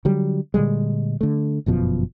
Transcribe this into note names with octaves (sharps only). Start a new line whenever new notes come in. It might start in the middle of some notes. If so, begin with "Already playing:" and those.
D3 F#3 G3
A#2 D3 G3 G#3
D3 A3
G1 F#2 B2 F3